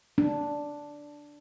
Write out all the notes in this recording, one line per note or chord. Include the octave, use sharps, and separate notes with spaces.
D4